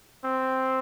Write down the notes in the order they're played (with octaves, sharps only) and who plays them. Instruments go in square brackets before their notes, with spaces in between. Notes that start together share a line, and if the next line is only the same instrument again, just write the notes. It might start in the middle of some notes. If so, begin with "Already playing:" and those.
[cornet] C4